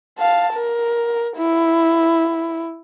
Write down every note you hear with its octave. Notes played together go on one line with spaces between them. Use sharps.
F5 A5
A#4
E4